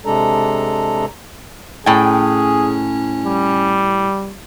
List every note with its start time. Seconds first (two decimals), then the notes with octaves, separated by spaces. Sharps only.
0.05 C3 G#3 D4 A4 A#5
1.86 A2 C#4 G#4 G5
3.25 G3